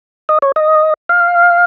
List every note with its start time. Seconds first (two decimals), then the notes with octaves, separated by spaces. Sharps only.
0.29 D#5
0.42 C#5
0.56 D#5
1.09 F5